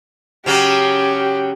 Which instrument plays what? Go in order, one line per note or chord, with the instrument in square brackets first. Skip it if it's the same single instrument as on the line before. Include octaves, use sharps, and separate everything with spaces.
[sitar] C#3 F#3 C#4 [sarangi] G4